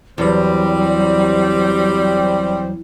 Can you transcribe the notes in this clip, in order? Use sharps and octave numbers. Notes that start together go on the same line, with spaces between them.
E2 F#3 G3 C4